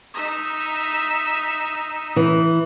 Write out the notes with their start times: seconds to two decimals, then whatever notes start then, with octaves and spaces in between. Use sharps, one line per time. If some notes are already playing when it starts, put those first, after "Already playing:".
0.14 D#4 E5
2.16 E3